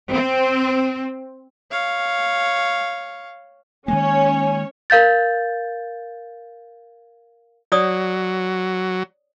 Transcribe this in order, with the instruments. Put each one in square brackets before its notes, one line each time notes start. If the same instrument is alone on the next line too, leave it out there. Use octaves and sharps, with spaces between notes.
[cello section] C4
[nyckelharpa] C#5 F5
[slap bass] D#3 G#3 A#3 [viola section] C#4 C#5 [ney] G#5
[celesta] A#4 F5 G6 A6
[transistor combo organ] F#3 [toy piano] C#5 D5 D#6